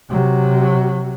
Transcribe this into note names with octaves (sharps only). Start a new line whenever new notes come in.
C3 F#3